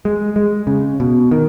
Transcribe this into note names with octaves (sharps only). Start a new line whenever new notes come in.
G#3
G#3
C#3
B2
D#3